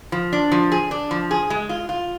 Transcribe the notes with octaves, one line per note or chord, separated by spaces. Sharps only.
F3
D4
F3
G#4
D4
F3
G#4
G#3
F4
F4